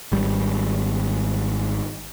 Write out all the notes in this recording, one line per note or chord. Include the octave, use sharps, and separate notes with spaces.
G#1 G3